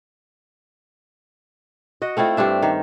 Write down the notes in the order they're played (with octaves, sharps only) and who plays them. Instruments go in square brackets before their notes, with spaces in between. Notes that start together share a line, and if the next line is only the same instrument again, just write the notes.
[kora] F#4 D#5
A3 C4 E4 F4
G2 C4 D4 E5
D#3